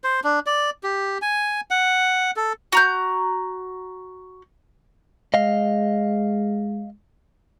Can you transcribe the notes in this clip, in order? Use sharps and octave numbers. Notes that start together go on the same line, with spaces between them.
C5
D4
D5
G4
G#5
F#5
A4
F#4 A#5 G6
G#3 D#5 F5